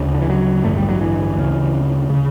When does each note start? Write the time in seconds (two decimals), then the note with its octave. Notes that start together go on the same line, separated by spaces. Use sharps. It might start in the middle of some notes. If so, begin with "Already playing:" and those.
Already playing: D2 C#3
0.14 D3
0.21 E3
0.30 F#3
0.65 A1 G2 D3 A3
0.77 G3
0.89 F#3
1.01 E3
1.36 D2 C#3
2.10 C#3